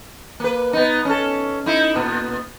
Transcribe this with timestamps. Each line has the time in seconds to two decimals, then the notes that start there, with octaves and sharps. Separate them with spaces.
0.40 A#3 B4
0.73 B3 D#4
1.05 C#4 A4
1.66 D#4 E4
1.95 A#2 B3